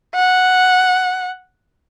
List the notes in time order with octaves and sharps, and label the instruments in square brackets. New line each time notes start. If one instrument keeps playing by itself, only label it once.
[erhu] F#5